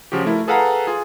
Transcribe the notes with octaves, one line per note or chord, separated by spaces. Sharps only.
C#3 F3 F#4 G4
A3 E4 A#4
G#4 A4 B4 F5 F#5 A#5
F4 G#4